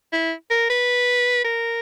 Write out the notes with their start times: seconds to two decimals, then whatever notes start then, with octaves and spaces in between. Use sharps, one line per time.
0.12 E4
0.51 A#4
0.70 B4
1.44 A#4